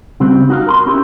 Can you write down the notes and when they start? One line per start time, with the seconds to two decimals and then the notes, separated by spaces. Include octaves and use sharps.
0.20 C#3 G3 C4 F#4
0.49 D#4 F#4 A#4 C5 F5
0.67 A#4 B5 C6
0.86 C#4 E4 G4